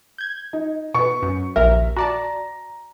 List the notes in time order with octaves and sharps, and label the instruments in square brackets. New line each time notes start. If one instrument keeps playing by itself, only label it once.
[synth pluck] G6 G#6
[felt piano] D#4
[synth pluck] B2 [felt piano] B4 C#6
[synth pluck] F#2
[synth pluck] A#1 D#2 A#4 [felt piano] E5
[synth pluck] F#4 D5 A5 [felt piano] A#5